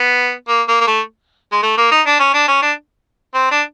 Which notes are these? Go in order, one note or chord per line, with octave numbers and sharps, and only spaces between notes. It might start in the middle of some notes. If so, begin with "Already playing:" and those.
Already playing: B3
A#3
A#3
A#3
A3
G#3
A3
A#3
D#4
D4
C#4
D4
C#4
D4
C4
D4